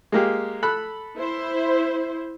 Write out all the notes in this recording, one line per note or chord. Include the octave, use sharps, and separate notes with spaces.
G#3 A#3 G4
A4 B5 F#6
E4 C5